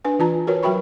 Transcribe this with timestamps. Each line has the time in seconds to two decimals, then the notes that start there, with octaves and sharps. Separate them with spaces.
0.05 D4 B4 G#5
0.19 E3 F4 A5 A#5
0.47 F#4 A#4 B4 C#5
0.63 F#3 F#4 E5 G5 B5 C#6